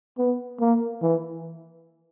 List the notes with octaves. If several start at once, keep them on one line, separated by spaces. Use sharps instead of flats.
B3
A#3
E3